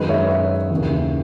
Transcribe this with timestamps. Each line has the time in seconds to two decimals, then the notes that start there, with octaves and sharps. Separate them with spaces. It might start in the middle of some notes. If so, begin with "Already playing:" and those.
Already playing: F#2 D#3 G#3 B4 D#5
0.09 C#5 E5
0.30 C#5 E5
0.71 D#2 C#3 E3